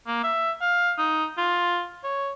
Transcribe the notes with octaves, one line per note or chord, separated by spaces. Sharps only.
A#3
E5
F5
D#4
F4
C#5